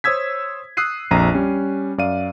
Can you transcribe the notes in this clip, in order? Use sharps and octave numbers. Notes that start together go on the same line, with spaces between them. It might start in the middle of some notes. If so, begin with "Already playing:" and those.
C5 C#5 D#6 E6 G#6 B6
D#6 E6 F#6 C7 D#7
A#1 F2 A#5 D#7
G3 C#4
F#2 D5 F5 D#7